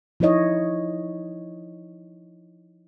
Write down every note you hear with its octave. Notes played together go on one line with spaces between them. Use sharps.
F3 D#4 E4 C#5 D#5